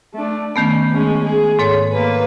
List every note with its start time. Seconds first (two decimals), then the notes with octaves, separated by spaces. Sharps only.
0.14 A3 D4
0.56 D#3 A3 B3 C#4
0.91 G#3 C#4
1.24 G#4
1.59 G#2 A4 C#5
1.93 A#3 B4